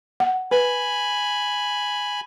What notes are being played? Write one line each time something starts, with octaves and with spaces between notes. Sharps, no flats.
F#5
B4 G#5 B5